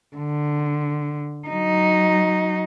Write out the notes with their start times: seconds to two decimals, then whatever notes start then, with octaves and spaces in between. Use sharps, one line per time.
0.17 D3
1.48 F#3 D#4